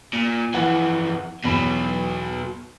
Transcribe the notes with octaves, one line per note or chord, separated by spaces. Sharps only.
A#2
F2 E3 F#5
E2 B2 F#3 B5